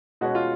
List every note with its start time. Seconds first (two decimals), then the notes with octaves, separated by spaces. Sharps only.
0.21 B2 G#3 C#4 F#4
0.35 F4